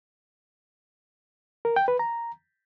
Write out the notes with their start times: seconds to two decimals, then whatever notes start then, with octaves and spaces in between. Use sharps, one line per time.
1.65 A#4
1.76 G5
1.88 B4
1.99 A#5